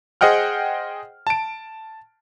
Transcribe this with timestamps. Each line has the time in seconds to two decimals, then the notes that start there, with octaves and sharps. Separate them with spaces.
0.21 G#4 C5 D#5 F#5 G5 F6
1.27 A5 D7